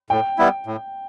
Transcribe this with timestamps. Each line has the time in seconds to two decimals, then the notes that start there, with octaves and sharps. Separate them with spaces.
0.10 A2 G5
0.38 G3 B3 E4
0.66 A2